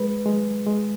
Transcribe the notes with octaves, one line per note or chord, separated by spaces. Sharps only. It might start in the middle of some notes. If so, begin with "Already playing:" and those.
Already playing: G#3 B4
G#3
G#3